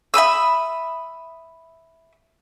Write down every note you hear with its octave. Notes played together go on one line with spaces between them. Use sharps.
E5 B5 D#6 E6